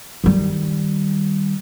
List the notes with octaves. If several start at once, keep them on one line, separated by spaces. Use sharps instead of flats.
D#3 G3